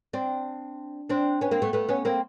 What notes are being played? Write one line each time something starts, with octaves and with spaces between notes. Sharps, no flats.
C4 D4
C4 D4
B3 C#4
A#3 C4
A3 B3
A3 B3
B3 C#4
A#3 C4